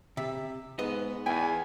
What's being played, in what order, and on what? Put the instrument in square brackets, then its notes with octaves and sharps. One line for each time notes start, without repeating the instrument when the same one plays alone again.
[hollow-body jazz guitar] C3 [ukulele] E5
[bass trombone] G#2 [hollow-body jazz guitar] B3 D#5 [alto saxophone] B4
[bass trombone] E2 [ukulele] E4 G5 [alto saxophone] G#5